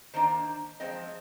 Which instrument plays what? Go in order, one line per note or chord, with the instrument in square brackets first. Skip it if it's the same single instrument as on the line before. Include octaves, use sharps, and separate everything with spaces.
[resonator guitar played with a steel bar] D#3 A#3 D4 C5
F3 G#3 C4 D#5